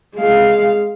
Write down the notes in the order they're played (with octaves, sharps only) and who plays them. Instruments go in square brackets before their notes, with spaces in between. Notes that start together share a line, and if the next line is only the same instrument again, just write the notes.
[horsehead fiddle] G#3 F5